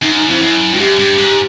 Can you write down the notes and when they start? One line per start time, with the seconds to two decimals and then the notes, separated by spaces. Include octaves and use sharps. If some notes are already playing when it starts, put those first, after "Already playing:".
0.02 F#2 D#4
0.15 D#4
0.28 F2 E4
0.41 F#2
0.73 G2 F#4
0.79 F#2 G4
0.99 G2
1.18 G#2